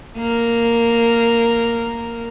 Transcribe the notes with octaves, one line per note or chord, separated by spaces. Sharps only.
A#3 A#4